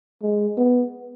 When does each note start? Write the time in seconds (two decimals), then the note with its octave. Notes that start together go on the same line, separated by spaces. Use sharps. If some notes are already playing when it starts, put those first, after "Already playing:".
0.22 G#3
0.58 B3